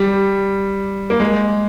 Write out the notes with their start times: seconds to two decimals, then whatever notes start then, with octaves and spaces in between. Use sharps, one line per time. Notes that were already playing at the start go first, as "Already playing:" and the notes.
Already playing: G3
1.10 A#3
1.20 G#3